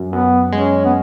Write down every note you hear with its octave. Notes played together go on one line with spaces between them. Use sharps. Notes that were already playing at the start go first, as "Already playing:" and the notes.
Already playing: F#2
F#2 B3
G#3 C#4
B3